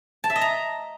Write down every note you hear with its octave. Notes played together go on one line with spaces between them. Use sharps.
A5
E5
D#5
A#5